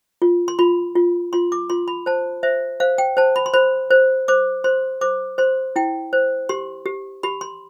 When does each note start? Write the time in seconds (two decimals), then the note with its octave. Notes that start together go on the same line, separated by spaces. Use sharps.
0.22 F4
0.48 C6
0.59 F4 B5
0.96 F4
1.33 F4 C6
1.52 D6
1.70 F4 C6
1.88 B5
2.06 C5 A5
2.43 C5 E5
2.80 C5 F5
2.98 G5
3.17 C5 A5
3.36 B5
3.46 C6
3.54 C5 B5
3.91 C5
4.28 C5 D6
4.64 C5 C6
5.01 C5 D6
5.38 C5 C6
5.76 E4 G5
6.13 C5
6.49 G4 C6
6.86 G4
7.23 G4 B5
7.41 C6